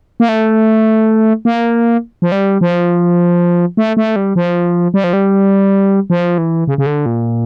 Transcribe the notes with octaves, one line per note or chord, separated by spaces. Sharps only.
A#3
A3
A#3
F3
G3
F3
A3
A3
G3
F3
G3
F3
G3
F3
E3
C#3
C#3
D3
A#2